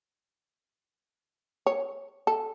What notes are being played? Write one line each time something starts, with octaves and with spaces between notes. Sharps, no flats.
C#5
A4